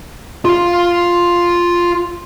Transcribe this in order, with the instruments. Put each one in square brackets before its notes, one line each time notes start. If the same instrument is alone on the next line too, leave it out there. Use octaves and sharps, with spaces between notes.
[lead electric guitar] F4 F5